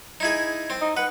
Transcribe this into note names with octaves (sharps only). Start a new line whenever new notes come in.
D#4 E4 G#4
C4
D#4
B4 F#5